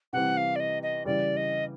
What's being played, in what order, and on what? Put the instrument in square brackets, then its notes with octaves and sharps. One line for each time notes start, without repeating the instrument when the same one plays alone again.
[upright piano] C3 E3 G3 C4 [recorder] F#5
[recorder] F5
D5
D#5
D#5
[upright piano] C#3 E3 G3 [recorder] D5
[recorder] D#5